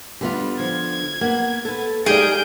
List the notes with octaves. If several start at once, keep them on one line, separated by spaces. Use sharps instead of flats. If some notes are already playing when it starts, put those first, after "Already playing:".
D3 G3 B3 F4
F3 G#6
A#3 B3 F#5
A4 B4
G#3 D#4 G4 G#4 D5 F5 G6 D7